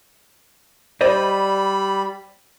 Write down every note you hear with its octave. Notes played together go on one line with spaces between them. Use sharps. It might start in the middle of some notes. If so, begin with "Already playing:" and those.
G3 C5 D5 D#5 B5